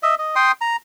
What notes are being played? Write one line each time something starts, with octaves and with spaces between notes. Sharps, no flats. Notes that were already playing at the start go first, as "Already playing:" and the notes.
D#5 E5
D#5
G5 C6 D#6
A#5